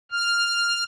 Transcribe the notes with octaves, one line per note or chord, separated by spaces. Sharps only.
F6